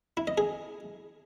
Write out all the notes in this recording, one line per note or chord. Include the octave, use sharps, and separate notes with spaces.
E4
D#5
G#4